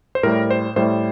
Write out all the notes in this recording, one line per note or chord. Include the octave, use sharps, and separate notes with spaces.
C5
A2 G3 A#4
C5
A2 G3 C5